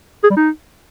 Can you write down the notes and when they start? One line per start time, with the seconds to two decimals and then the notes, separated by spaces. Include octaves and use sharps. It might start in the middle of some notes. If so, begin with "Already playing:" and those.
0.24 G#4
0.30 G3
0.37 D#4